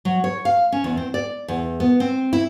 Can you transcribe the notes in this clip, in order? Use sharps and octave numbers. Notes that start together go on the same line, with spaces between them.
F#3
C#5
F5
C#4
E2
C4
D5
E2
B3
C4
E4